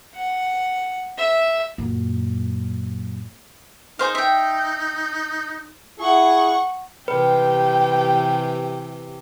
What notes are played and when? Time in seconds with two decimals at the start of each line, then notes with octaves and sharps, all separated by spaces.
0.15 F#5
1.18 E5
1.78 F#2 A#2
3.99 D#4 G#4 C5 F5
4.15 E5 G5
6.00 E4 G#4 F#5 C#6
7.08 C3 E3 G4 B4 G5